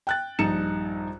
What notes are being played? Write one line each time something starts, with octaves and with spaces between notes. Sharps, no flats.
G5 F#6 A6
A#1 G2 D#4 A#5 C#7 E7